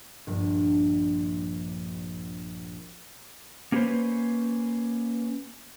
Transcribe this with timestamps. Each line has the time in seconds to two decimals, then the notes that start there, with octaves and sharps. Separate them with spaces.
0.27 A#1 G2
3.72 A#3 C#4 G4 G#4 B4 C5